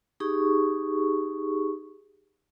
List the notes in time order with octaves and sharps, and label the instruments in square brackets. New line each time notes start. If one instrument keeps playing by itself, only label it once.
[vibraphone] D#4 G4 G#4 C#6